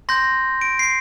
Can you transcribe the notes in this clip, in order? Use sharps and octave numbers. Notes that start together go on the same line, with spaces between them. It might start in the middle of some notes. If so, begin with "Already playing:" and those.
C6 G6 A#6
D7
C7